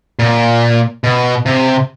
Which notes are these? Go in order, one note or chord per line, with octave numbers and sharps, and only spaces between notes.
A#2
B2
C3